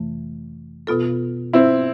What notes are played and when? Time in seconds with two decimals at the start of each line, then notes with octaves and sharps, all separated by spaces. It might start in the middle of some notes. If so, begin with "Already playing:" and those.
Already playing: F2 C3 E3 A3
0.87 B2 B3 F4 A4
1.53 C4 E4